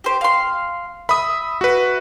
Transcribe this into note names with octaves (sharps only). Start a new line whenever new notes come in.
G4 C5
F5 C6
E5 B5 D#6
F#4 B4